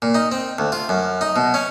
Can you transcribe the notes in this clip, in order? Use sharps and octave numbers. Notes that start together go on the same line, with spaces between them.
A#2
D#4
C4
D2
F4
F#2
D#4
B2
C#4